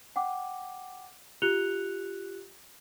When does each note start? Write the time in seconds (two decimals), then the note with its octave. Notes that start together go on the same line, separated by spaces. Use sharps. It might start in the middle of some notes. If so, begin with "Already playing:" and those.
0.16 F#5 G5 D6
1.42 F4 G4 F#6 C#7 F7 G7